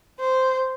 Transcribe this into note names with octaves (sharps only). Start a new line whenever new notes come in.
C5